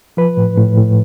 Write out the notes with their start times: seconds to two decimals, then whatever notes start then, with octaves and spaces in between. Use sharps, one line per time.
0.17 F3 B4
0.37 A2
0.57 A2
0.77 A2